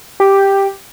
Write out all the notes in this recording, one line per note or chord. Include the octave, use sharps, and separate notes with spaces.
G4